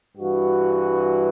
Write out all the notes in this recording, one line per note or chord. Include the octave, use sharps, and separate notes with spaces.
G2 E3 F#4